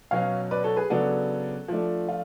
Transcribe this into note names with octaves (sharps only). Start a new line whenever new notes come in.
B2 F#3 C#4 C#5 F5
B4 D5
A4 C#5
G#4 B4
C#3 F#3 B3 D4 F#4 A4
F3 A3 D4
F4